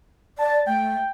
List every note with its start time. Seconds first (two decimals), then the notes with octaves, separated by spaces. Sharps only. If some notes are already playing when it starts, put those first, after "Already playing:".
0.38 D5 A5
0.67 A3 G5